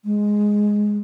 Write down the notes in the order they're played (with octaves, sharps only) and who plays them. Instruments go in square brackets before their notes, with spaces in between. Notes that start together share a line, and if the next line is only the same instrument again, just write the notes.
[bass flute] G#3